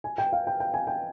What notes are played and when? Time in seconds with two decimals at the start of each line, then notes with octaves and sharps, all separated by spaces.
0.04 G#5
0.18 G5
0.33 F5
0.47 G5
0.60 G5
0.74 G#5
0.87 G5